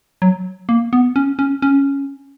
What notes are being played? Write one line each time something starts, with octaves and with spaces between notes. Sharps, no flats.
F#3
A#3
B3
C#4
C#4
C#4